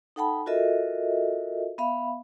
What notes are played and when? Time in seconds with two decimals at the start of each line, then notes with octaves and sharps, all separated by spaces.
0.16 D#4 A4 F#5 G5 A5 B5
0.46 F4 F#4 A4 A#4 D#5 E5
1.78 B3 E5 F5 B5